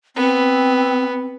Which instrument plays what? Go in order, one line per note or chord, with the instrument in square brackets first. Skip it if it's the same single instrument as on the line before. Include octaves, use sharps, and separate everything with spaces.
[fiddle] B3 [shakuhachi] C4